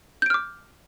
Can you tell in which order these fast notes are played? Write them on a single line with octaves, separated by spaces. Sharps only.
G6 D7 F6 D6